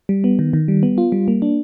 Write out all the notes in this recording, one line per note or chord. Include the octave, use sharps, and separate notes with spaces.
G3
B3
D#3
D#3
G3
B3
F4
G3
A#3
D4